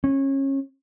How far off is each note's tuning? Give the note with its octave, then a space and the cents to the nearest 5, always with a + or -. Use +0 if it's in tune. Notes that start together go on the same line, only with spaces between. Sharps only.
C#4 -25